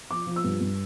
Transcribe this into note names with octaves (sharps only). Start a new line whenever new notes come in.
F3 D6
F3
E6
G2
G2